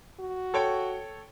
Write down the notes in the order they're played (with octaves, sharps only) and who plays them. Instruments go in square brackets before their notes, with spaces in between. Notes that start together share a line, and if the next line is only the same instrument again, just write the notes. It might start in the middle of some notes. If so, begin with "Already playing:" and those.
[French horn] F#4
[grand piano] A4 C#5 G5